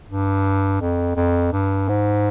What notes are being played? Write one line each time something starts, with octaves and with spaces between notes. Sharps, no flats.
G2
F2
F2
G2
G#2